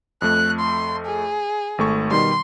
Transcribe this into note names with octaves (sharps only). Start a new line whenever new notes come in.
F2 A3 F#6
C6
G#4
G#1 A3 C#6
B2 D#3 G3 C6